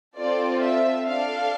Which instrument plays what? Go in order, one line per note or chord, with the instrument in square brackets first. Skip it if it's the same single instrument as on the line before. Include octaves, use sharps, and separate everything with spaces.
[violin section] C4 F4 A4 D5
E5
D4 A4 F5